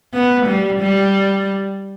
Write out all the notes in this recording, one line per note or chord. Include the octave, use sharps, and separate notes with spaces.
B3
G3
G3